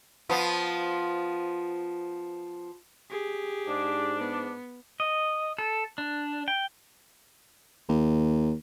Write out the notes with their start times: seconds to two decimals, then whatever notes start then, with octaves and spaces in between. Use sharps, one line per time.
0.29 F3 B3
3.10 G4 G#4
3.67 G#2 D4
4.19 B3
5.00 D#5
5.58 A4
5.98 D4
6.48 G5
7.89 D#2